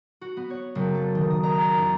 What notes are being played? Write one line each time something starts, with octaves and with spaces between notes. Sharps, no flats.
F#4
B3
C#5
F#1
A4
D#3
D#6
A#5
A6
E2